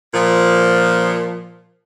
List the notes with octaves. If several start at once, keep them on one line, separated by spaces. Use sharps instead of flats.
A#2 F3